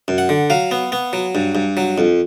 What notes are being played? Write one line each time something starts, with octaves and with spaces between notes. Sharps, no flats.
F#2
F#5
D3
F#3 F5
B3
B3
F#3
G2
G2
F#3
F2